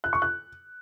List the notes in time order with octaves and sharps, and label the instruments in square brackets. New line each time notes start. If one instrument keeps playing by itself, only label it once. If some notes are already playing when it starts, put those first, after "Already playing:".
[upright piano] F#6
C#6
F#6